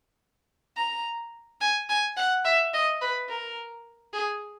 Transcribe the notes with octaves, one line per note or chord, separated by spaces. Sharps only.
A#5
G#5
G#5
F#5
E5
D#5
B4
A#4
G#4